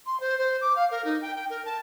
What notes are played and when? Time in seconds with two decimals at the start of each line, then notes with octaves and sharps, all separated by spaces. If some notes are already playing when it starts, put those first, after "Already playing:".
0.06 C6
0.20 C5
0.38 C5
0.61 D6
0.76 F5
0.91 A#4
1.05 D#4
1.22 G5
1.36 G5
1.50 A#4
1.65 A5